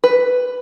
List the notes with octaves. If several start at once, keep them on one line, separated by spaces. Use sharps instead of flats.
B4